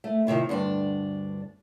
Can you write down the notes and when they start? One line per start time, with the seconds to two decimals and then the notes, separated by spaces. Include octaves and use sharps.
0.04 A3
0.27 A2 C3 D#3 F3
0.49 D2 G2 D4